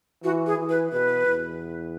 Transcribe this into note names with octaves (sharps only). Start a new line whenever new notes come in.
E3 F#4
G#4
E3
B4
B2 B4
E2